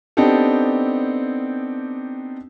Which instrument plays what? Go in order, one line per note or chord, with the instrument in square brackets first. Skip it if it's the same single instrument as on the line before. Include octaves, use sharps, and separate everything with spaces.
[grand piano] B3 C4 D4 D#4 G4 A4